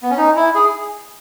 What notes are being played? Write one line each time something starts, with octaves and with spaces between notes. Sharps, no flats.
B3
C#4
D#4
E4
G#4